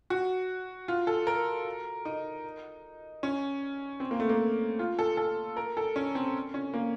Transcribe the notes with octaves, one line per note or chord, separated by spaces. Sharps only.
F#4
F4
A4
A#4
D#4
C#4
C4
A#3
A3
A#3
F4
A4
A4
A#4
A4
C#4
C4
C#4
A#3